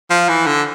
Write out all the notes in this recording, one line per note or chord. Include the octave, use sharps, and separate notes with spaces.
F3
E3
D3